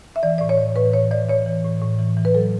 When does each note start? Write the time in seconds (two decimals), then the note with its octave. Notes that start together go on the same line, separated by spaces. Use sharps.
0.16 E5
0.23 E3 D5
0.38 A2 D5
0.49 C#5
0.58 E3
0.76 A2 B4
0.93 E3 C#5
1.11 E3 D5
1.29 E3 C#5
1.46 E3
1.64 A2
1.82 A2
1.99 E3
2.17 E3
2.25 B4
2.35 F#3 A4